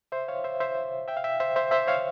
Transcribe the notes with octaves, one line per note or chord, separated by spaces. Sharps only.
C5 E5
C#5 F5
C5 E5
C5 E5
E5 G5
F5
E5 G5
C5 E5
C5 E5
C5 E5
C#5 F5